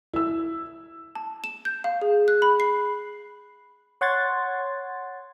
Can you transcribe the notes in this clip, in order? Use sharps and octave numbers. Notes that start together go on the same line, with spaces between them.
E4 E6
A5
E7
G6
F5
G#4
F#6
B5
C7
C#5 F#5 C6 G#6 A6